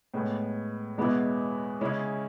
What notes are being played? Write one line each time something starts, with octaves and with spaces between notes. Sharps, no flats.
A2 G#3 B3
E2 B2 G#3 B3 E4
C#3 G#3 C#4 E4